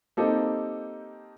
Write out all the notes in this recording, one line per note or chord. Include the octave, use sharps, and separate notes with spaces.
A#3 C4 D#4 G4 A4